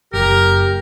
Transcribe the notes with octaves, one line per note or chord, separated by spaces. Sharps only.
F#1 G4 A#4